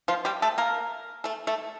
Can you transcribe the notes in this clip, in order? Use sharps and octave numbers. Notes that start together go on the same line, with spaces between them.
F3 F4
G3 G4
A3 A4
A#3 A#4
A3 A4
A3 A4